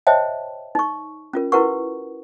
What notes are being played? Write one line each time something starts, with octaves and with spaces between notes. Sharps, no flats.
C5 C#5 D#5 E5 G5 A5
D#4 C#6
C#4 F4 A#4
E4 F#4 A#4 B4 F#5 C#6